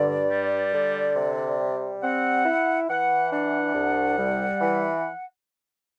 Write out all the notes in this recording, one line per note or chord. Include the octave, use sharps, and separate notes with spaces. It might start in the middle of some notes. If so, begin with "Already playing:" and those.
Already playing: G2 D3 D5
G3
D3
C3
G3
C4 F#5
E4
E3 F#5
D4 F#5
C2
G3
E3